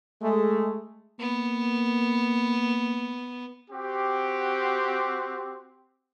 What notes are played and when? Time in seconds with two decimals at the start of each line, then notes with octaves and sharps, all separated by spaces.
0.21 G#3 A3
1.19 A#3 B3
3.71 C4 F#4 G4